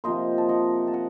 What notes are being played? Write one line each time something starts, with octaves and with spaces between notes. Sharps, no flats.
C3 F3 A#3 C5 D#5
A5
D#5 F#5
A5
D#5 F#5